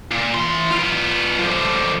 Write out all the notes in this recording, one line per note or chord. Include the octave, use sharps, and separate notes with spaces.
A#2
E3 C6
B3 F4
D3 F3